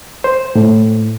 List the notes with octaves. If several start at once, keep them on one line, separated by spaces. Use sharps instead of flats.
C5
A2